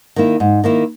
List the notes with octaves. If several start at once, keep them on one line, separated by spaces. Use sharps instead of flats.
D#3 A#3 E4
G#2
D#3 A#3 E4